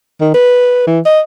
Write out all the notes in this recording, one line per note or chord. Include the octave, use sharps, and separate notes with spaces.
D#3
B4
E3
D#5